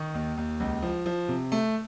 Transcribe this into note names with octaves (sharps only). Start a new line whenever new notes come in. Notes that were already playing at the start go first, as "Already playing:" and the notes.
Already playing: D#3 C#6 D#6
D#2
D#2
C#2
F3
F3
C3
A3